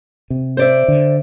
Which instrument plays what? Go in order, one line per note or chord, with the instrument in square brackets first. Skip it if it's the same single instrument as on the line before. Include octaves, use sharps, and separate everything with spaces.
[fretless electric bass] C3
[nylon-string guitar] C5 D5 E5
[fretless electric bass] D3